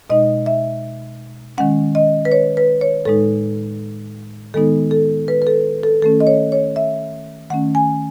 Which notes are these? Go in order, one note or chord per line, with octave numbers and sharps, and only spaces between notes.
B2 G#3 D#4 D#5
E5
D#3 G#3 C#4 F#5
D#5
B4
C#5
B4
C#5
A2 G#3 D#4 A4
D#3 G#3 B3 D#4 A4
A4
B4
B4
A4
A4
D#3 A3 C#4 A4
D#5
C#5
C#5
E5
D#3 A3 C#4 F#5
G#5